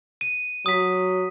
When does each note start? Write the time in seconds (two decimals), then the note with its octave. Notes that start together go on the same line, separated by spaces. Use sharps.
0.21 D#7
0.66 F#3 D#6 B6